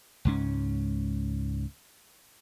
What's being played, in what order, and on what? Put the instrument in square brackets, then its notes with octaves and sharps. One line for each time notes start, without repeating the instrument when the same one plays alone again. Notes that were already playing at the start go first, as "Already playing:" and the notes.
[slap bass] C#2 G#2 C#4